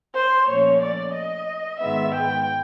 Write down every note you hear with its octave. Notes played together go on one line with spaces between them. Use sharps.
C5
A#2 F3 A3 C#4 C#5
D5
D#5
G#2 D#3 G#3 B3 E5
G5